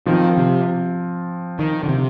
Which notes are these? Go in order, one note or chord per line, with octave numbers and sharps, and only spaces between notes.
D#3 F3 C4 F4
C3
D#3
D3
C3